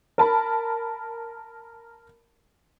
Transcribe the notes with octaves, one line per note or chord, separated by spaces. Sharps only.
A#4 A5 B5